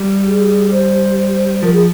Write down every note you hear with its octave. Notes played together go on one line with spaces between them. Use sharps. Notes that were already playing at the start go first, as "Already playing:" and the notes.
Already playing: G3
G#4
C5
F3 A#4
G#4